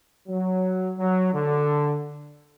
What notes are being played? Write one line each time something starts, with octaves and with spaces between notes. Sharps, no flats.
F#3
F#3
D3